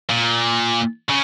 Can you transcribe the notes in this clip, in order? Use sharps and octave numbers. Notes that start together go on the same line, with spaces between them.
A#2
C#3